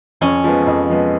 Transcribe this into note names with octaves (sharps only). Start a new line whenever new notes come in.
F2 C#4
F3 G#3 B3
F2
F3 G#3 B3